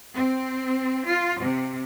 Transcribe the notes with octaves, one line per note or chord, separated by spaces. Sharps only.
C4
F4
C3